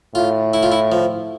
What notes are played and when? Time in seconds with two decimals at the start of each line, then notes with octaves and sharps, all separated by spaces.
0.15 A2 F4
0.54 E4
0.63 F4
0.72 E4
0.92 F3